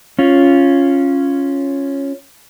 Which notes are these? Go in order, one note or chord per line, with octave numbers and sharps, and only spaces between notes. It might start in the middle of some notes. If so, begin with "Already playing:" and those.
C#4 F4